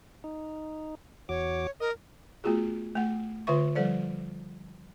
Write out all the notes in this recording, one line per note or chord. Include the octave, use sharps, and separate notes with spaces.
D#4
E2 F#4 C#5 D6
A#4 D#5
A3 B3 F4 F#4 G#4
A3 F#5
D3 F4 B4 E5 C#6
F3 G3 A4 C5 D5